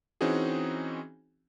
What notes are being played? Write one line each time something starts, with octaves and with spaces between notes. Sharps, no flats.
E3 C4 C#4 D#4 F#4 G#4